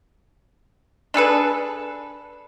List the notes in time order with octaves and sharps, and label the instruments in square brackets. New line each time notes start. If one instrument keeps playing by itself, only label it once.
[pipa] D4 G#4 A4 B4